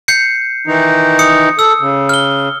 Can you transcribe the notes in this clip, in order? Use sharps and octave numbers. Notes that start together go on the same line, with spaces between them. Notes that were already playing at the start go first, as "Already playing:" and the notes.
G6 C7 C#7
D#3 E3 D#4
D#6 C#7
A4 E6
C#3
F6 G7